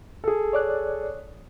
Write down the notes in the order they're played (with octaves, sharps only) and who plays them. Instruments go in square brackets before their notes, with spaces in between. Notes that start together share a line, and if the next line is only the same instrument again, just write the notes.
[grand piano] G#4 A4
[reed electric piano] C#5 D5 F#6